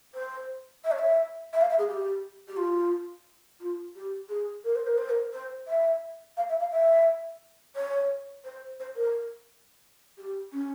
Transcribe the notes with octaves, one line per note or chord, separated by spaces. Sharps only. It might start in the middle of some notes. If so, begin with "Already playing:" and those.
C5
E5
C#5
E5
E5
F5
E5
G#4
G4
G4
F4
F4
G4
G#4
A#4
C5
A#4
C5
A#4
C5
E5
F5
E5
F5
E5
C#5
C5
C5
A#4
G4
C#4